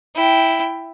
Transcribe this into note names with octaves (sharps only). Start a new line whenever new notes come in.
E4 G5